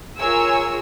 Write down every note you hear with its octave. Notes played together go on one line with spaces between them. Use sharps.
F4 G#4 A#4 C#5 G#5 E6